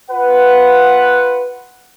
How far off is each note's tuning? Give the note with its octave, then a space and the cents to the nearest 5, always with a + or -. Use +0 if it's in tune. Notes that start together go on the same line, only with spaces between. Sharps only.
F4 +0 B4 +0 F#5 +0